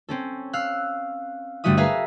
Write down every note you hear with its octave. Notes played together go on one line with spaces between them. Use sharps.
C4 C#4 A4
F5 E6 F#6
G1 G3 A3 F#4 E5 D#6
G#4 A#4 B4 E5 F5 A#5